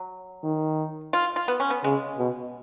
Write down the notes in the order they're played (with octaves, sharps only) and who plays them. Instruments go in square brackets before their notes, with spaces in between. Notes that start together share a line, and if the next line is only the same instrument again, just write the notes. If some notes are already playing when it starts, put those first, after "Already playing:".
Already playing: [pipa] F#3
[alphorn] D#3
[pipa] F4
F4
B3
C#4
B3
[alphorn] C#3 [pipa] G#3
[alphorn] B2